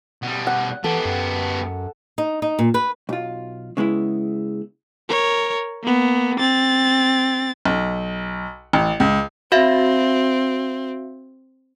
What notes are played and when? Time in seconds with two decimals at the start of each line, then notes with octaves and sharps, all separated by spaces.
0.23 B2 G3
0.47 F#5
0.84 E3 B3 G4 A4
1.05 F#2
2.18 D#4
2.42 D#4
2.59 A#2
2.74 B4
3.09 B1 F4
3.77 C#3 G#3 B3 E4
5.09 A#4 C#5
5.83 A#3 B3
6.40 C4 A6
7.65 B1
8.73 A1
9.00 C#2
9.52 C4 F#4 E5 F5